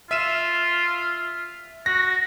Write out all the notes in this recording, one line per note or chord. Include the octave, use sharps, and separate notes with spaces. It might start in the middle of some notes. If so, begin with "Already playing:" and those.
F4 E5 D#7 E7
F#4 A#6